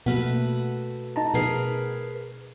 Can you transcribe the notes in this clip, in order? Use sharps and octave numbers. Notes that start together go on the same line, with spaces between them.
B2 A3 A#3 F#4 B4
D#4 A5 A#5
B2 G#4 A#4 B4 C7